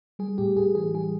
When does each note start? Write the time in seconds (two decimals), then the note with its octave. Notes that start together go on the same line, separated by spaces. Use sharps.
0.19 G3 G#4
0.38 A2 G4
0.56 A2 G#4
0.75 E3 G#4
0.94 G3 G#4